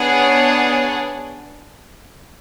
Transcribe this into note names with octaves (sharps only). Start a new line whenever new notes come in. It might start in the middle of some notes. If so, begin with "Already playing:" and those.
Already playing: B3 D4 G#4 C#5 F#5